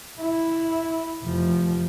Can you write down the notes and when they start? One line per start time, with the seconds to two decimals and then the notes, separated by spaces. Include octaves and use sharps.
0.21 E4
1.24 F1 F3